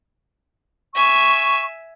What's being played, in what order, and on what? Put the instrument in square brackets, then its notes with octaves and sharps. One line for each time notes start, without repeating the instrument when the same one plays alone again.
[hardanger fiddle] E5 G#5 [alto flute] C#6